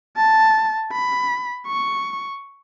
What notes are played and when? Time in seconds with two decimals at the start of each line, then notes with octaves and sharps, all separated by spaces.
0.17 A5
0.92 B5
1.67 C#6